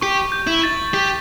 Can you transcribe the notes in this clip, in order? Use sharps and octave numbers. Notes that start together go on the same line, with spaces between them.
G4 C#6
G6
E4
A6
G4 B6